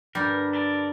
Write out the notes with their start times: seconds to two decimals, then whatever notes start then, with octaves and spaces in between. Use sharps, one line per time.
0.15 G2 D3 G3 A#4 B4
0.53 A4 A#4 D5